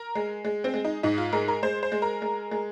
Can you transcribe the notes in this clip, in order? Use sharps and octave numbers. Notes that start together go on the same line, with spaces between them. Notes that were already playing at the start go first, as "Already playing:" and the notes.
Already playing: A#4
G#3
G#3
C4
G#3
D#4
G#2 D#4
F4
G#3 A#4
A#4
G#3 C5
C5
G#3
A#4
G#3
G#3